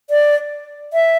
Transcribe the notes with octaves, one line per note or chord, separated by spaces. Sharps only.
D5
E5